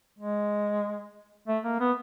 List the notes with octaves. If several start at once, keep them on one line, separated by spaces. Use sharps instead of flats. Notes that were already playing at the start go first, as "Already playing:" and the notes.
G#3
A3
A#3
B3